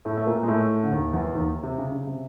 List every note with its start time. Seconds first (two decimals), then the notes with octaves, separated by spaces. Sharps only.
0.05 A2 A3
0.17 A3
0.27 A#2 A#3
0.43 G#3
0.48 A2 A3
0.83 D3
0.92 D#2 D#3
1.13 E2 E3
1.35 D#2 D#3
1.63 C3
1.78 C#3
1.92 C#3
2.07 C3